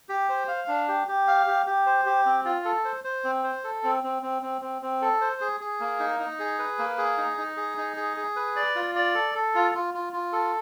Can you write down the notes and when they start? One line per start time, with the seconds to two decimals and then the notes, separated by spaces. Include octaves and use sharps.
0.09 G4
0.29 C5
0.48 F5
0.68 D4
0.88 G4
1.08 G4
1.27 F5
1.47 G4
1.66 G4
1.86 C5
2.06 G4
2.26 C4
2.45 F4
2.65 A4
2.85 C5
3.04 C5
3.24 C4
3.44 C5
3.64 A4
3.84 C4
4.04 C4
4.22 C4
4.42 C4
4.61 C4
4.82 C4
5.02 A4
5.21 C5
5.41 G#4
5.60 G#4
5.80 A#3
6.00 D#4
6.20 D#4
6.39 G#4
6.59 B4
6.79 A#3
6.98 G#4
7.18 D#4
7.37 D#4
7.57 G#4
7.78 D#4
7.97 G#4
8.17 G#4
8.36 B4
8.56 D5
8.76 F4
8.95 D5
9.14 A4
9.35 A4
9.55 F4
9.75 F4
9.94 F4
10.13 F4
10.33 A4